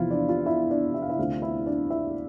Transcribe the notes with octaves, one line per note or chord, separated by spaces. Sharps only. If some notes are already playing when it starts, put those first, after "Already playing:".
Already playing: E2 C3 F3 B3 E4 F4 F5
D4 D5
F4 F5
E4 E5
D4 D5
E5
F5
E4 E5
D2 D3 A3 C4 F4 F5
E4 E5
D4 D5
E4 E5